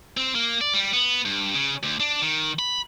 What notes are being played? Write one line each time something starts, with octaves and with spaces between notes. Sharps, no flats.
C4
A#3
D5
G3
B3
G2
C#3
D2
D4
D#3
B5